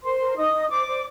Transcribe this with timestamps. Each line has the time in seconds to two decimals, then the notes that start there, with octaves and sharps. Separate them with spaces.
0.03 A#4 C5 C6
0.19 A#4
0.36 D#4 D#5 D#6
0.53 D#4
0.69 C5 D5 D6
0.87 C5